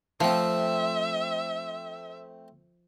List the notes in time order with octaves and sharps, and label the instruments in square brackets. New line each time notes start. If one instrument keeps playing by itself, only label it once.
[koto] F3 [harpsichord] A3 C4 [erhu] E5